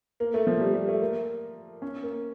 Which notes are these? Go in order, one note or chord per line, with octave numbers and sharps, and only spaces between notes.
A#3
A3
F3
G3
G3
A3
A#3
C#4
A#3